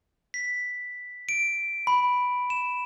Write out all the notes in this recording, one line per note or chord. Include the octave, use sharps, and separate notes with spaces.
B6
D7
B5
E7